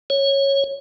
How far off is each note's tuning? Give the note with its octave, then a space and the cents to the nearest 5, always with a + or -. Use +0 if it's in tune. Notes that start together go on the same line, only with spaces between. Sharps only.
C#5 -10